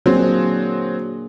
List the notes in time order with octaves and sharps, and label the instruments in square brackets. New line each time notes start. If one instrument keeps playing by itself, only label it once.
[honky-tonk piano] F#3 C4 [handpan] A#3 D4 G#4